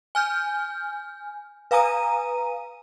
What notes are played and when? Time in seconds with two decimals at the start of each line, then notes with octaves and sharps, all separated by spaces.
0.15 G#5 F6 G6
1.71 B4 F5 G#5 A#5 D#6 D#7